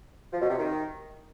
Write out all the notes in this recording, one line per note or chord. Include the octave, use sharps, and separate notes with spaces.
F3
B2
C3
D#3